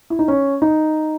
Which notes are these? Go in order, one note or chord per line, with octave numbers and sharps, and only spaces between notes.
E4
D#4
C#4
D#4